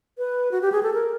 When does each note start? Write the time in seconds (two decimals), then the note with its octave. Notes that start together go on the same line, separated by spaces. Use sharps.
0.18 B4
0.51 F#4
0.62 G4
0.72 G#4
0.83 A4
0.94 A#4